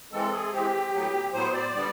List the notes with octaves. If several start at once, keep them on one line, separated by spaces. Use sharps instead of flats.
E3 G#3 C4 A4
G#4
E3 G#3 C4 G4
A2 F#3 B3
A2 F#3 B3 C5
D5
D3 G3 B3